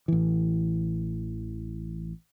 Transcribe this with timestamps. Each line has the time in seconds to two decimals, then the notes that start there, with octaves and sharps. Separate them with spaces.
0.08 A1 E3